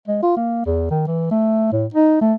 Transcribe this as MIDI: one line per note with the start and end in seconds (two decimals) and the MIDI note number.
0.08 0.19 56
0.23 0.36 65
0.37 0.63 58
0.66 0.89 40
0.90 1.03 51
1.07 1.31 52
1.31 1.68 57
1.72 1.86 45
1.94 2.17 63
2.21 2.34 57